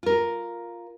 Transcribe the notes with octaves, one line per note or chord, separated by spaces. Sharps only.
F4 A#4